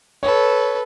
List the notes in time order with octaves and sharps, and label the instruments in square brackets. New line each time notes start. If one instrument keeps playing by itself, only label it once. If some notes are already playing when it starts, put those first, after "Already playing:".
[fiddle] A4 B4 [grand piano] C#5